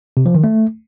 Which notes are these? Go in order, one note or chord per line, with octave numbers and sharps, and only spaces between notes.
C3
F3
D#3
A3